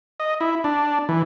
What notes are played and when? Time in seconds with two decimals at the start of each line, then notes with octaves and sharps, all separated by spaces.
0.20 D#5
0.41 E4
0.64 D4
1.09 E3